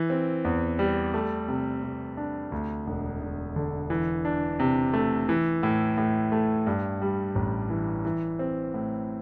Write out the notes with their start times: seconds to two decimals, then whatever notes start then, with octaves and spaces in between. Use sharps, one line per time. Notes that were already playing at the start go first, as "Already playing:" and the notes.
Already playing: E3
0.10 C4
0.45 E2
0.79 G3
1.14 A3
1.48 C3
1.83 C3
2.17 D4
2.52 D2
2.87 E1
3.21 E1
3.56 D3
3.90 E3
4.25 D4
4.59 C3
4.94 A3
5.29 E3
5.63 A2
5.97 A2
6.32 A3
6.67 G2
7.02 G3
7.35 A1
7.70 E3
8.05 E3
8.39 C4
8.74 A2